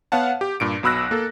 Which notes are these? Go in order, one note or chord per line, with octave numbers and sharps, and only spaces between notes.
B3 C#5 F5 F#5 A5
G4
G2 A#2 D7
B1 B2 B5 E6 F#6 A#6
A#3 A4